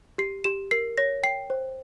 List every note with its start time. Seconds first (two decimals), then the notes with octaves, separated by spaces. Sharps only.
0.18 G4 C7
0.44 G4 E7
0.71 A#4 C7
0.98 C#5 A#6
1.23 G5 C7
1.50 C5